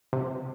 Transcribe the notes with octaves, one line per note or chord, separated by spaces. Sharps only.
C3